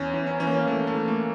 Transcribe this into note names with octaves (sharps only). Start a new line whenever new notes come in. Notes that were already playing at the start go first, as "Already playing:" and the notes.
Already playing: E2 C#4
E3
C#4
E3 C#4
A#3
E3 A3
A3
E3
A#3